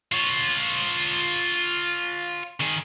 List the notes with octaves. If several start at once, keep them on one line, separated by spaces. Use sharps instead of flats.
F4 C#5
D#3 G#4